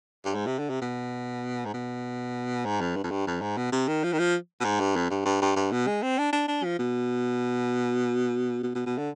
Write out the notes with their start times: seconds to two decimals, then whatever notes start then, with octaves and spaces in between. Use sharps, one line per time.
0.25 G2
0.35 G#2
0.47 C3
0.59 D3
0.69 C3
0.82 B2
1.65 G#2
1.74 B2
2.65 G#2
2.81 F2
2.96 G2
3.04 F2
3.11 G2
3.27 F2
3.41 G#2
3.57 B2
3.72 C3
3.88 D#3
4.04 F3
4.13 D#3
4.19 F3
4.60 B2
4.65 G#2
4.80 G2
4.96 F2
5.10 G2
5.25 G2
5.42 G2
5.56 G2
5.72 B2
5.87 G#3
6.03 C4
6.18 D4
6.33 D4
6.48 D4
6.64 F3
6.79 B2
8.63 B2
8.75 B2
8.86 B2
8.98 D3